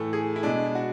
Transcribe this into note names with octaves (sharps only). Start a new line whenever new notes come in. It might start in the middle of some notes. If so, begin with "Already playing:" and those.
Already playing: A2 E3 A3
G#4
E4
B2 G#3 D4
F#4